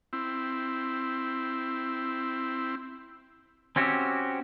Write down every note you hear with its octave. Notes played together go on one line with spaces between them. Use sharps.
C4 E4
C4 C#4 F#4 G4 E5